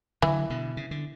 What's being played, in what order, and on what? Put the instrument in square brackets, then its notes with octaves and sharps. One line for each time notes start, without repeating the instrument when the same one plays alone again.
[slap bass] D3 F#3 [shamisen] E3
[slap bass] B2 D3
C#3
D3